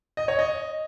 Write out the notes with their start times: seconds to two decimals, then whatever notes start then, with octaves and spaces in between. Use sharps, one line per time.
0.17 D#5
0.28 C#5
0.39 D#5